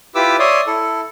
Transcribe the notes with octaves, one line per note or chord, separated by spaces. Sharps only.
E4 F4 G4 B4 D6 E6
C#5 D5 E5 C6 D#6
E4 A4